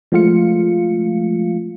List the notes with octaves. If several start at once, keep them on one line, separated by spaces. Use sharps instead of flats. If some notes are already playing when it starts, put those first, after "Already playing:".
F3 G#3 A3 F4 F5 C#7